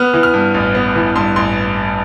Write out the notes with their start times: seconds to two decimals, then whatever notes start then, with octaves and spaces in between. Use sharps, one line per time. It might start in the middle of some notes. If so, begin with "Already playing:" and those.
Already playing: B3 F6
0.14 E3
0.23 F6
0.34 G2
0.54 A1
0.75 B3
0.95 E3
1.16 G2 C6
1.36 A1 C6